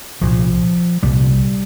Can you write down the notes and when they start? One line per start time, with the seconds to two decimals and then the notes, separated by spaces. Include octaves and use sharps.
0.21 C2 A#2 F3
1.03 C2 A#2 G3